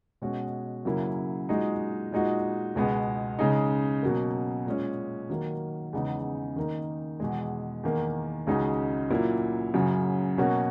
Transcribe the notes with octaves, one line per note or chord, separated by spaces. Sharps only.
B2 G#3 C#4 F#4
F#2 C#3 F#3 A#3 E4
A#2 G#3 D#4 F#4
A#2 G#3 D#4 F#4
C#2 B2 G#3 B3
C#3 G#3 D#4
B2 F#3 A#3
A#2 G#3 C#4
D#3 F#3 A#3
E2 C#3 G#3 B3 D#4
D#3 A#3 D#4
E2 B2 G#3
E2 D#3 A#3
C#2 C#3 G#3 D#4 F#4
A#2 F#3 A#3 E4
F#2 C#3 F#3
B2 F#3 A#3 C#4 F#4